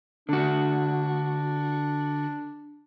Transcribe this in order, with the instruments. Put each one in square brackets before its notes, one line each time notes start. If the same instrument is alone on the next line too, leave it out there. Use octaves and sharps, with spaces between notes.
[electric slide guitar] D3 F#4 [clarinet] D4